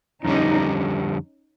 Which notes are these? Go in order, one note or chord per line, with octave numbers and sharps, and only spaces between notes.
F2 D3 G3 C#4 D#4